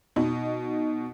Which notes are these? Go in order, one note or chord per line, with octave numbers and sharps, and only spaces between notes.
B2 D#4